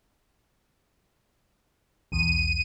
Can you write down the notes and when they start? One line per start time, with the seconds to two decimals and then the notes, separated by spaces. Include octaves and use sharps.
2.12 B1 E2 D#7